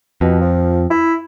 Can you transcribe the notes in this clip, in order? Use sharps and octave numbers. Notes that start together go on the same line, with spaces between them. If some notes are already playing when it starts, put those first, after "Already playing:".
F2 B2
F3
E4